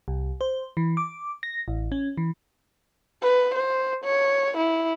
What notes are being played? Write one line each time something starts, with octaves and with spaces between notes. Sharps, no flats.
C2
C5
E3
D6
A#6
A1
C#4
E3
B4
C5
C#5
E4